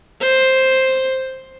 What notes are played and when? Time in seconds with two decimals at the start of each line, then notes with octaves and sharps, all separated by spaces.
0.21 C5